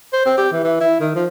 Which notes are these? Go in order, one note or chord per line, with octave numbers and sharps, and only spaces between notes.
C5
C4
G4
E3
E3
E4
D#3
F3